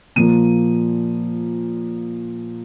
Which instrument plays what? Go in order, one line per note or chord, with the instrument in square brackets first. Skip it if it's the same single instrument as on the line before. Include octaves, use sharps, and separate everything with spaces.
[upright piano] A#2 F3 A#3 D#7